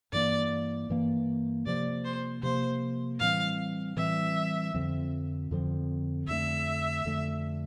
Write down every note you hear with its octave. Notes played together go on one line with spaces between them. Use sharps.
G2 E3 A#3 D5
G2 E3 A#3
C3 F3 A#3 D5
C5
C3 F3 A#3 C5
A2 E3 G3 C4 F5
A2 E3 G3 C4 E5
F2 D3 F3 C4
F2 D3 F3 C4
F2 D3 A3 E5
F2 D3 A3